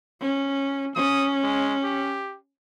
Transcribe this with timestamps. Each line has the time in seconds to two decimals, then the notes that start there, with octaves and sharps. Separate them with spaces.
0.21 C#4
0.95 C#4 D#6
1.43 G#3
1.83 G4